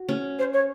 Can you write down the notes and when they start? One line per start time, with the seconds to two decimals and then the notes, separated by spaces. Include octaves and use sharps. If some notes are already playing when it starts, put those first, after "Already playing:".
Already playing: F#4
0.09 C#4
0.39 C5
0.53 C#5